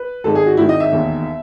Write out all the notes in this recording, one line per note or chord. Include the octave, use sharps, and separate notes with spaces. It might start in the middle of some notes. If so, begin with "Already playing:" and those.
Already playing: B4
G#1 G#2 D#3 G#3 A4
G#4
F#4
G#1 G#2 D#3 G#3 E4
D#5
E5
E1 D#2 D#3